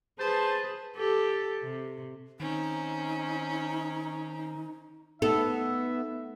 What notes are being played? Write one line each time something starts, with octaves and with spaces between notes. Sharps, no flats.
G#4 B4 C5 A5
G4 A4
C3
D#3 C4 C#4 D#4
A3 B3 D#4 A4 E5